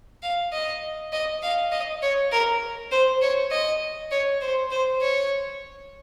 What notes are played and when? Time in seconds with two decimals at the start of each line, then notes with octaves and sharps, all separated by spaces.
0.22 F5
0.52 D#5
1.12 D#5
1.42 F5
1.72 D#5
2.02 C#5
2.32 A#4
2.91 C5
3.22 C#5
3.51 D#5
4.11 C#5
4.41 C5
4.71 C5
5.01 C#5